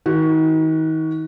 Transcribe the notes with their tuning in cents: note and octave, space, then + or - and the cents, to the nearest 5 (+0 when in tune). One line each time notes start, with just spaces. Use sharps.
D#3 +35 F#4 +10